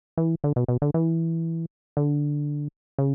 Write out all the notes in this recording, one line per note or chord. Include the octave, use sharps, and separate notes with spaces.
E3
D3
B2
B2
D3
E3
D3
C#3